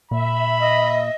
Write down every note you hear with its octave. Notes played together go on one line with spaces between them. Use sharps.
A#2 E5 B5
D#5